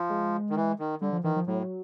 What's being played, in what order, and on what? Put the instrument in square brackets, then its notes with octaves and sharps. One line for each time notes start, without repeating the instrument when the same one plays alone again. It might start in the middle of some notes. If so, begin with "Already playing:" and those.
Already playing: [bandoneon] F3
[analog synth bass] G#3
[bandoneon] D#3
E3
D#3
[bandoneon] D3 [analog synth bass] G3
[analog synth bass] F3
[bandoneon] D#3 [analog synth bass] E3
[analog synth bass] F3
[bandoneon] A2 [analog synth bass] F#3